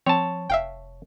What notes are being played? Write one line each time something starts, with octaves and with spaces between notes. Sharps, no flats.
F3 C4 C#5 A5
F1 E5 F5 G5